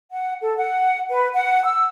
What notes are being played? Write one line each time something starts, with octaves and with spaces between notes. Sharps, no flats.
F#5
A4
F#5
B4
F#5
E6